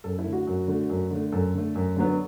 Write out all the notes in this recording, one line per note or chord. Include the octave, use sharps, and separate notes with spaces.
F#2 A4
E4
D3 A3
F#4
F#2
D3 A3
F#2
D3 A3
F#2 A4
D3 A3
F#2
D3 F#3 B3